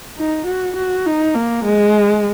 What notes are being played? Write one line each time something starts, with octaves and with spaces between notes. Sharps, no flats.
D#4
F#4
F#4
D#4
A#3
G#3